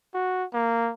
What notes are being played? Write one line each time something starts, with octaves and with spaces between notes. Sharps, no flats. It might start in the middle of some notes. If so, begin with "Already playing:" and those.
F#4
A#3